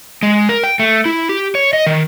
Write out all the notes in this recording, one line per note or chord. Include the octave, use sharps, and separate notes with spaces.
G#3
A#4
G5
A3
E4
G4
C#5
D#5
D#3